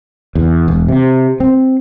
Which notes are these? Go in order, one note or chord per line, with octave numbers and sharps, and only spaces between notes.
E2
E1
C3
C4